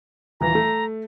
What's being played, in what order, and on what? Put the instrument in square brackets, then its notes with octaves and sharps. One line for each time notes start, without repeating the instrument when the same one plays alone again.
[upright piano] D#1 E3 [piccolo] A#5
[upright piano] A3